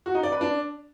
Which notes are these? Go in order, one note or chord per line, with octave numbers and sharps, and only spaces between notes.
F#4
D#4
D5
B4
D4